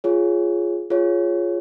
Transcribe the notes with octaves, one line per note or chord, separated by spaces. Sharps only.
F4 G#4 C#5
F4 G#4 C#5